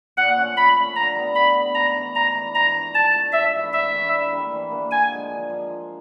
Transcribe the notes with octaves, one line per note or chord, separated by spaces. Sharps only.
A#2 F#5
F3 A3 C#4
A#2 B5
F3 A3 C#4
D3 A#5
G3 B3
D3 B5
G3 B3
G#2 A#5
E3 A3 D4
G#2 A#5
E3 A3 D4
G#2 A#5
F3 A3 D4
G#2 A5
F3 A3 D4
G#2 E5
E3 A3 D4
G#2 E5
E3 A3 D4
E3
G3 A#3 D4
E3
G3 A#3 D4
D3 G#5
F3 G#3
D3
F3
G#3
F3